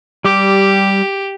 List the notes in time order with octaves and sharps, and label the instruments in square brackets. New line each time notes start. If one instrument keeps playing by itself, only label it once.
[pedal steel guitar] G3 D6 [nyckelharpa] G4